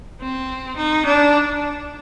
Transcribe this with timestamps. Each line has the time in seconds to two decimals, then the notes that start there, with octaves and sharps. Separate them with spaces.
0.20 C4
0.76 D#4
1.06 D4